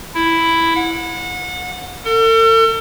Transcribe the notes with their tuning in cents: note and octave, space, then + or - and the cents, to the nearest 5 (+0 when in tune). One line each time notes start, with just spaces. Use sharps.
E4 +5
F#5 -30
A4 +45